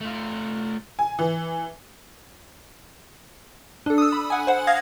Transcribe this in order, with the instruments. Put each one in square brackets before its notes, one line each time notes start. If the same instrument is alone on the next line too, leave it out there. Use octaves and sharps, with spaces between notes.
[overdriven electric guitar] A3 F4
[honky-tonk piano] G#5
E3
[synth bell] D4 A4
D#6 E6
B5
F#5 G#5
C5 F#5
F5 D#6 G#6 A#6